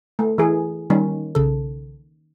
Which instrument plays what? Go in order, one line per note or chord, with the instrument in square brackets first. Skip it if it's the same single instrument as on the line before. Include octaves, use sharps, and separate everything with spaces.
[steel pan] A3
E3 G#4
[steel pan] D#3 C#4 [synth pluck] G3
[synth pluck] B1 C#3 A4